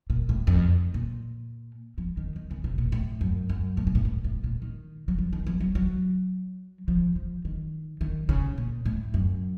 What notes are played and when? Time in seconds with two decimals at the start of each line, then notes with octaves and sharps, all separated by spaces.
0.10 A#2
0.29 A2
0.47 F2
0.94 A#2
1.98 F3
2.17 D#3
2.36 D#3
2.51 C#3
2.64 C3
2.78 A#2
2.92 A2
3.21 F#2
3.49 F#2
3.77 A2
3.87 A#2
3.95 A2
4.05 A2
4.24 A2
4.44 A#2
4.62 D#3
5.08 F#3
5.18 F3
5.33 D#3
5.47 F3
5.60 F#3
5.75 F#3
6.88 F3
7.16 F3
7.45 D#3
8.01 D#3
8.29 C#3
8.58 A#2
8.85 A2
9.14 F#2